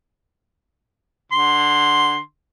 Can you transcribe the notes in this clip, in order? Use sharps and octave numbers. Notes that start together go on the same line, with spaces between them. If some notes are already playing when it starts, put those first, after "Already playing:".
D3 C6